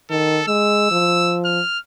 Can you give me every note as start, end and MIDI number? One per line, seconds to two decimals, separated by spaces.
0.11 0.41 51
0.11 0.47 69
0.48 0.90 56
0.48 1.40 88
0.91 1.60 53
1.45 1.79 89